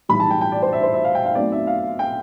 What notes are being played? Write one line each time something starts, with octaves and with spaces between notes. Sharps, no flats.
B1 A2 E3 G3 B5
A5
G5
G5
D5
C5
E5
C5
E5
F5
G5
F5
B1 B2 A3 C4 D5
E5
F5
G5